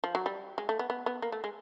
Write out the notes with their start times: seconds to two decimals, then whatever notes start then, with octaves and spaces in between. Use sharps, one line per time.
0.04 F3
0.15 F#3
0.26 G3
0.58 G#3
0.69 A3
0.79 B3
0.90 B3
1.06 B3
1.22 A#3
1.32 A3
1.44 G#3